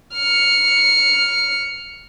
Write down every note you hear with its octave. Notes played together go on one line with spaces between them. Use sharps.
F6 C#7